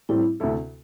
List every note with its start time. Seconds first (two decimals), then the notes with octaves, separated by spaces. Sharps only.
0.09 A2 G3 C4 E4
0.40 D2 C3 A3 E4 A4